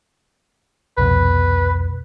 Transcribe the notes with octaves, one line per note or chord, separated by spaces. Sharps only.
C2 F2 B2 B4